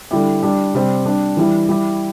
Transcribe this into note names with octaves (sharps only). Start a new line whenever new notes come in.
D3 G3 E4 G4
G3 D4 G4
C3 G3 C4 G4
G3 D4 G4
E3 G3 E4 G4
G3 E4 G4